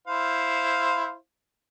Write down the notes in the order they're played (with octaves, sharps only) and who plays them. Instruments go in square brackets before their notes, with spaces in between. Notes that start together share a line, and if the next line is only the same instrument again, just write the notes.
[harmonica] E4 C5 F5